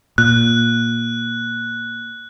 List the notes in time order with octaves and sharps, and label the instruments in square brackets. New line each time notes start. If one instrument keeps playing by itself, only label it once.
[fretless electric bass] A#2 [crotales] F#6